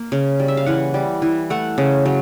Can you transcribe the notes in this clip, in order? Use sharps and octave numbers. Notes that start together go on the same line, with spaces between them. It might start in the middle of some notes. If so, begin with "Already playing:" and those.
Already playing: A#3
C#3
G3
E5
F5
E3 F#5
G3
E3
A3 F#5
C#3
F#3